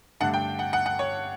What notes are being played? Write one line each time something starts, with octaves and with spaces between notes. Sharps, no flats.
G2 D3 A3 D4 F#5
G5
F#5
F#5
F#5
C#5